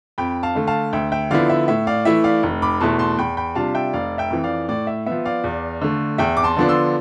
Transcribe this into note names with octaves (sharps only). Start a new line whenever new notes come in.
F2 G5 B5
F5 A5
D3 A3
F5 A5
D2 E5 G5
E5 G5
D3 F3 B3 E4 D5 F5
E5
A2 E5
D5 F5
E3 A3 E4 E5
D5 F5
F1
B5 D6
E2 B2 A3 E4 A5 C6
A5 C6
E2 G5 B5
G5 B5
C3 G3 D4 F4 F5 A5
E5 G5
F1 D5 F5
E5 G5
F2 E3
D5 F5
A2 D5
E5
F3 B3 E5
D5 F5
E2
D3 A3
E2 E5 G5
D6
A5 C6
D3 F3 B3 D4
C6 E6